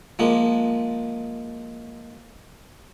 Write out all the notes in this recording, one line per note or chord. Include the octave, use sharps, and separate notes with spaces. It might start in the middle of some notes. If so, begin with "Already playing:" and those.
F3 G#3 A#3